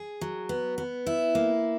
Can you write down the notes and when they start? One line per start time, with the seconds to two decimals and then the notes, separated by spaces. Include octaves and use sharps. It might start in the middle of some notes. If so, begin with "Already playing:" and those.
Already playing: G#4
0.21 F#3
0.49 B3
0.78 B3
1.07 E4
1.35 A#3